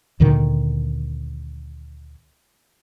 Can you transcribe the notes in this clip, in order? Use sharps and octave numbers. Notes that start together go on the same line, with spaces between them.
D2 A#2 D3 D#3